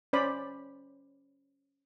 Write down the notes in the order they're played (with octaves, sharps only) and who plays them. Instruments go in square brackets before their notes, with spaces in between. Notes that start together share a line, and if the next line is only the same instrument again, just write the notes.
[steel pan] C#4 C5 D5 B5